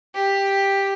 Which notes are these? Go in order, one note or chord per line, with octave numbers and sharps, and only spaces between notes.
G4